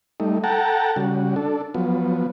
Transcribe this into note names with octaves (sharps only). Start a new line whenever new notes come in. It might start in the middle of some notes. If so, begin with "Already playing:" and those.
G3 A3 D#4
A4 F#5 G5 A5 A#5
C#3 G3 F#4
D4 A4
F3 F#3 B3